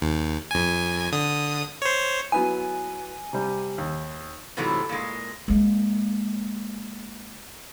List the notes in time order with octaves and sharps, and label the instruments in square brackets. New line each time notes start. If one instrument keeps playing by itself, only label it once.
[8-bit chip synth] D#2
F2 G#5
D3 D#6
C5 C#5
[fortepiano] F#3 B3 E4 [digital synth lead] G#5
[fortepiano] C3 G3
D#2
[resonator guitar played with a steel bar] G#2 C3 E3 F#3 A3
A#2 G#3
[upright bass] G#3 A#3